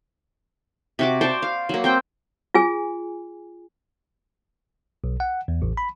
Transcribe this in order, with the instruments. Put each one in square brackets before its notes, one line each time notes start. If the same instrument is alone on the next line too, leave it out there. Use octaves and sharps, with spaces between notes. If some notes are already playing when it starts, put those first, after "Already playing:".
[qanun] C3 F#4 D6
C5 D5 A5 C#6
F5
F#3 A#3
C4 C5 G5
[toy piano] F4 G#4 G#5
[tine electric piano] B1
F#5
E2
A1
B5